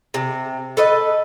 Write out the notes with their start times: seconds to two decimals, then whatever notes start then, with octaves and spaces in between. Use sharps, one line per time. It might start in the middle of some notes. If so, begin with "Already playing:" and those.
0.14 C3
0.77 A4 B4 D#5